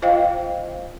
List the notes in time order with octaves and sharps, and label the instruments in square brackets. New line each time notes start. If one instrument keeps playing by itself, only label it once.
[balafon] F4 C5 D#5 F5 G5